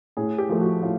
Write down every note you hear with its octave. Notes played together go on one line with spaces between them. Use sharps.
A2 G#4
G4
F3 A3
F#4
A2 F4